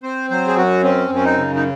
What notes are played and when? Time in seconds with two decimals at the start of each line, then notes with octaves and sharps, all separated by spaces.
0.03 C4 C5
0.30 F#3 C5
0.48 G#4
0.56 F#2 F#4
0.83 C4 C#4
1.10 F#2 C#4
1.24 D#4
1.38 C#3
1.55 D#4